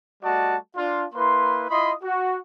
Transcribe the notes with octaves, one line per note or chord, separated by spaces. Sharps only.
G3 A3 F#4 D5 D#5 A5
D4 F4
A#3 E4 B4 C6
E4 F4 D#5 B5 C6 D#6
F#4